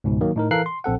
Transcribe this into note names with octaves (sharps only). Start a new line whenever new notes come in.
C#2 G#2 B2
D#3 F#3 A#3
A2 D#4 A#4
E3 A4 A#4 F5 F#6 C7
C6
A#1 C4 A4 F#5